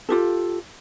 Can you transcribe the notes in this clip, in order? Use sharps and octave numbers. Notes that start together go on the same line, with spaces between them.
F4 G4 A4